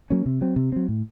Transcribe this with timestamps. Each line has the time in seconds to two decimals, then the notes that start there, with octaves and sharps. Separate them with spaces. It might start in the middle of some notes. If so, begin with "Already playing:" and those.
0.10 F#3 A#3 C#4
0.26 C3
0.41 F#3 C4
0.56 C3
0.72 F#3 C4
0.88 A2